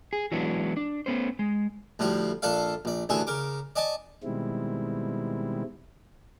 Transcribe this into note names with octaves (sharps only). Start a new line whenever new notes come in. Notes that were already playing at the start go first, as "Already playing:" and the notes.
G#4
E3 F#3 G#3 B3 D4 E4
D4
A3 B3 C#4 C5
G#3
D2 A2 F3 G3 C6
A#1 D4 A4 D5 F5
A#1 D5
A1 D2 D3 G#4 A4 G#5
C#3 A#4 D6
D5 D#5 G#5 A5 D6
B2 D#3 G3 G#3 C4 E4